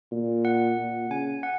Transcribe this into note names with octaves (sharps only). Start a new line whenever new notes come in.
A#2
F#5
A#2
C#3 G#5
F#5